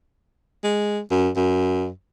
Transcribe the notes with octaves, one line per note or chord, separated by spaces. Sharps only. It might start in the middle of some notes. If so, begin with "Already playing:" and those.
G#3
F#2
F#2